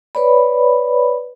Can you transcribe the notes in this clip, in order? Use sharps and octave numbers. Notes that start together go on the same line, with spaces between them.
B4 C#5 D5 B5